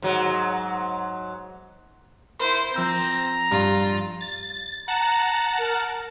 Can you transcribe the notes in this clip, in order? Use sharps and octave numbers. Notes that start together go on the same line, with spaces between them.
G#2 F#3
E4 A#4 C5 B5 C6
F3 C4 A#5 E6 G6
G2 F4
A6
F#5 A5 A#5
A#4